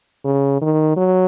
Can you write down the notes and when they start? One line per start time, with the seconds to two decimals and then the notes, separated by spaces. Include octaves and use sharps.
0.25 C#3
0.61 D#3
0.97 F#3